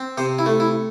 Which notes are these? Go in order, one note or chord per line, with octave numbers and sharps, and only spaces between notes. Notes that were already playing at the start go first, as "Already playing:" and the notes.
Already playing: C4
C3 C5
E4
A3
E4